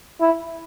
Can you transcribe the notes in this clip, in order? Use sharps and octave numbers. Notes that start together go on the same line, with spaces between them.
E4